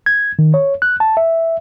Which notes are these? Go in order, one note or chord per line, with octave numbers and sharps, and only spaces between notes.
G#6
D#3
C#5
F#6
A5
E5